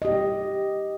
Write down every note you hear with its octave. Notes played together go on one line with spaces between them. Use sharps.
G4 D#5